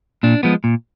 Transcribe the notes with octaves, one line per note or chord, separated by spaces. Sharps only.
A#2 D4
F3 G#3 B3
A#2